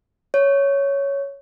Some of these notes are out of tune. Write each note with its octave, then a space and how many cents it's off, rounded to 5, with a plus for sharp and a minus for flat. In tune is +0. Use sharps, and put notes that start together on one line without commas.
C#5 +5